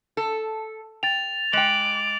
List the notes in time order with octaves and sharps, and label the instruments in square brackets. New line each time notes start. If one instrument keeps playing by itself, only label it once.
[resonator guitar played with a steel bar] A4
[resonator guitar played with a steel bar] G5 [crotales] A6 F7
[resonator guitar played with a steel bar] G#3 G5 [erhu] D6 [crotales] F#7